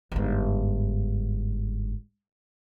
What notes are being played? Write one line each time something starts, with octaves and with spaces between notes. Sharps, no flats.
G1 G#2